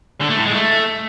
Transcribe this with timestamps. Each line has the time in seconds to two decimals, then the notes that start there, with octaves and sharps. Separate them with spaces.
0.21 D3
0.29 A3
0.37 A2
0.45 G#3
0.53 A3